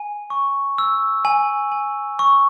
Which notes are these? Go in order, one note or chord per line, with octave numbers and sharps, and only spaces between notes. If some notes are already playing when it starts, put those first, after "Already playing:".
Already playing: G#5
C#6
E6
G#5
G#5
C#6